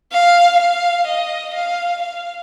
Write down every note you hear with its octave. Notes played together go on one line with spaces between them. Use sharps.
F5
F5
D#5
F5
F5